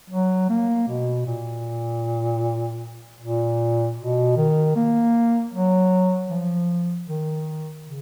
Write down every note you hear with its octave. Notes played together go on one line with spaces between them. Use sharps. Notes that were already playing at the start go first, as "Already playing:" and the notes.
F#3
A#3
B2
A#2
A#2
B2
D#3
A#3
F#3
F3
D#3
C#3